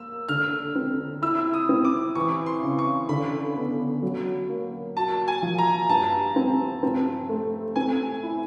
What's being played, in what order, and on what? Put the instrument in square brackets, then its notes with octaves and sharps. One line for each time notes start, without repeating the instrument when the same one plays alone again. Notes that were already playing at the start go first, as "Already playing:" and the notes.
Already playing: [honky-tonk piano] A#3 [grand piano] E6
[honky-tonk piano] D3 [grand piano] F6
[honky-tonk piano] C4
[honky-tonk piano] E4 [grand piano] E6
[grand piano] D#6
[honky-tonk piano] C4
[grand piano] D6
[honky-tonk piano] E3 [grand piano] C#6
[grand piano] C6
[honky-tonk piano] C#3
[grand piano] C#6
[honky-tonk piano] D3 [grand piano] B5
[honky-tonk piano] B3
F#3
A#3
[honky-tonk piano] F#4 [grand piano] A5
[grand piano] G#5
[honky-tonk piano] F3
[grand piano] A#5
[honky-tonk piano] G2 [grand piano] A5
[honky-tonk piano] C4
C4
A3
[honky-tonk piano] C4 [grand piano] G#5
[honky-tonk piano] E4